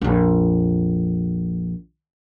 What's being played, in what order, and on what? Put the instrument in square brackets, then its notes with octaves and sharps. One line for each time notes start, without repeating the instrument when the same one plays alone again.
[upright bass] A#1 F2